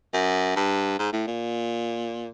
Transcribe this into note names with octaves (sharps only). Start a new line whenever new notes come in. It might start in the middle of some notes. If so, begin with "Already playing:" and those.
F#2
G2
G#2
A2
A#2